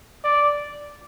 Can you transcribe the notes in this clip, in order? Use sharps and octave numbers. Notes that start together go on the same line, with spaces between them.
D5